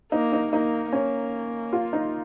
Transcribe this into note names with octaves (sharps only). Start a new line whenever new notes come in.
A#3 D#4
D#4
A#3 D#4
A#3 C#4
F4
D#4